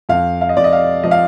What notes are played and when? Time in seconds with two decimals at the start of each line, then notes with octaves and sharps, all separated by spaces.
0.09 F2 F5
0.41 F5
0.49 D#5
0.56 F2 D5
0.64 D#5
0.73 F5
1.03 F3 D#5
1.11 F5